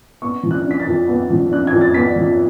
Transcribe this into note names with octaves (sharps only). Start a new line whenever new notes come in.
B3 C#6
F3
F#6
D4
B6
A6
F2
B3
F3
D4 F#6
G#6
F2
A6
B3 B6
F3